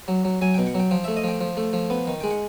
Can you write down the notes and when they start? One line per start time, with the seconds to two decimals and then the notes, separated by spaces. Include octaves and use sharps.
0.08 F#3
0.25 F#3
0.41 F#3 G#5
0.54 B2 G5
0.67 F#5
0.75 F#3 G5
0.91 F3 G5
1.04 A3 E5
1.17 D#5
1.24 F3 G5
1.41 F3
1.57 A3
1.73 F3
1.90 B3
2.07 D#3
2.21 G#3 G5
2.31 F#5